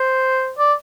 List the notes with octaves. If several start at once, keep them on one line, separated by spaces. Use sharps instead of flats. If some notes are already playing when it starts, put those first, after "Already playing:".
Already playing: C5
D5